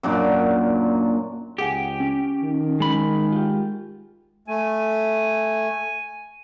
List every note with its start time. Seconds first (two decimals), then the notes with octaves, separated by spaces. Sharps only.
0.03 F#2 A#2 D4 D6
1.58 C#2 G4 G#4 F#5 G#5
2.00 C#4
2.43 D#3
2.80 G#3 B5
3.33 F4 G4
4.48 A3 G#5